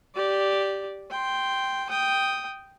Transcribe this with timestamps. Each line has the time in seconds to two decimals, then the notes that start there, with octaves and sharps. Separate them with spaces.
0.15 G4 D5
1.10 G5 C6
1.89 G5 D#6